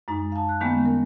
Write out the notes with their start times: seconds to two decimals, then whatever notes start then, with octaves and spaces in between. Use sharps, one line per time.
0.08 F#2 G#3 D#4
0.32 F5 A5
0.49 F#6
0.61 D#3 G3 G#3 A#3 B3 C#4
0.85 A#4